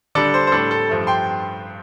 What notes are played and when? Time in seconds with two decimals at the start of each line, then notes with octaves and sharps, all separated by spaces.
0.15 D3 G3 D4 A4 D5
0.34 C5
0.47 C5
0.52 A2 G3 D4 A4
0.71 A4
0.89 G2 F3 A3
1.07 G5 C6